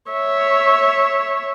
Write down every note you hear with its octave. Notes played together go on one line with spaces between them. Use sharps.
C#5 E5